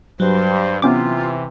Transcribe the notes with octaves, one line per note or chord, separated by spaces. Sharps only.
G2 F#3 C5
C3 E3 B3 C#4 F4 D6